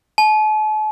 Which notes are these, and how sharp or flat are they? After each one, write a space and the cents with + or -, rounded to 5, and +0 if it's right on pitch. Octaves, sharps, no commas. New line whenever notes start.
A5 -45